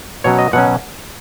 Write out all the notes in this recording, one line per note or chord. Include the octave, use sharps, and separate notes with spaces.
B2 F#3 C#4 C#5
D#5
B2 F#3 C#4 F#5